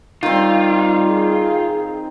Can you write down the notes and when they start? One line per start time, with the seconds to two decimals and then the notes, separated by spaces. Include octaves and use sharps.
0.23 D#3 G3 C4 F4
1.07 G#4